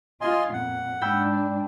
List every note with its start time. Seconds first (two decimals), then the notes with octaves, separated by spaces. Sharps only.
0.21 F4 D#5 G#5 C6
0.53 F2 A#2 F#5
1.01 G#2 D4 G5 B5 E6